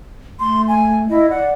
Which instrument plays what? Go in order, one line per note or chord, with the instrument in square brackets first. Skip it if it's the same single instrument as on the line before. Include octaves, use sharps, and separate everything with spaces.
[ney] A3 [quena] C6
[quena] G#5
[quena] E4 [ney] D#5
[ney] D5 [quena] F#5